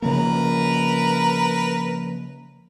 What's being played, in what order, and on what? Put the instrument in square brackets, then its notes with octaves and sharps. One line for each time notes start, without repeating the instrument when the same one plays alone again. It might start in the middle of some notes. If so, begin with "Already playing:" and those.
[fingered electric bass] C#3 F3 A#3 [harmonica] A#4 B4 A#5